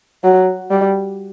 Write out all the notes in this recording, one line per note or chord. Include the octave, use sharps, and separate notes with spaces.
F#3
G3